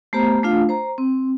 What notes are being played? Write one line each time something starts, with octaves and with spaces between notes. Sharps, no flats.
A3 B3 G4 C5 A#5
A3 D4 F4 F5
C5 A#5
C4